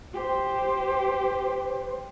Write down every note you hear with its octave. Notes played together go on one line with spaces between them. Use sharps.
G4 C5